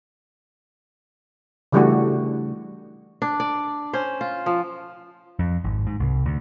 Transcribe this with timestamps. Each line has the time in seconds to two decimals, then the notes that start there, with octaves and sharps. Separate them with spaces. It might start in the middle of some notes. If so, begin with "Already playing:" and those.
1.72 C#3 E3 G3 A3 D4 F#4
3.22 D4
3.40 D5
3.93 C#4 C5
4.21 F4
4.46 F3
5.39 F2
5.64 G#1
5.87 G#2
6.00 C2
6.26 D2